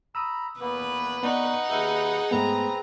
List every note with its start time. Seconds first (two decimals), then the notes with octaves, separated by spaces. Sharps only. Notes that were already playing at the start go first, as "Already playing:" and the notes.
0.15 A#5 B5 D#6 E6
0.60 E2 A#3 B3 B4
1.23 F2 B3 D#4 D5 F#5 A#5 C#6
1.70 D#2 G#4 B4 E5 G6
2.31 G#2 A3 B3 C4 B4 A#5